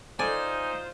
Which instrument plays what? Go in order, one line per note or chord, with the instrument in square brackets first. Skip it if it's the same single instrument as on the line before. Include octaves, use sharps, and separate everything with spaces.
[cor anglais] D#4 [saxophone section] F4 C5 [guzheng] D5 [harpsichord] G#5